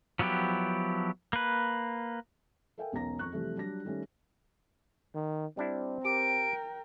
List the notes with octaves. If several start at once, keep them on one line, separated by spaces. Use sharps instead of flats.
F3 F#3 B3 E4 G4
A#3 B4
A4 A#4 E5 F5 G5 G#5
E1 B1 C#4 A#5 A#6
F2 C#6 F#6
C3 E3 F3 G3 A3
F#3 G3 D4 A#6
D#3 G3 A3 C#4 D#4
D#3
G3 C4 D4 E4
G4 A#4 G5 D7